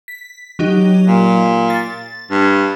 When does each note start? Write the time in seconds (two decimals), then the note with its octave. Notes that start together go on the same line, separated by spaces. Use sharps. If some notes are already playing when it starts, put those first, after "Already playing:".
0.08 B6
0.59 F#3 D#4 G4
1.08 A#2
1.70 A6
2.31 G2